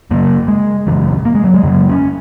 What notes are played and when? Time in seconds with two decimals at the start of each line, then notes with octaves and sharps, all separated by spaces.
0.11 F#2 C#3 A#3
0.48 G#3
0.87 F#2 C#3 E3
1.25 A#3
1.35 G#3
1.44 F#3
1.54 G#3
1.63 F#2 C#3 A#3
1.89 C#4